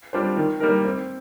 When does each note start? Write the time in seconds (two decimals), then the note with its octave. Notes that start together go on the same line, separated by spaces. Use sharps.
0.13 G3 D4 F4 C5
0.37 D#3
0.60 G3 A#3 D#4 A#4
0.85 C4